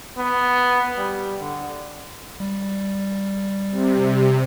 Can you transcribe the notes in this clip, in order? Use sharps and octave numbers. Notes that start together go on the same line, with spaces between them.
B3
G3
D3
G3
C3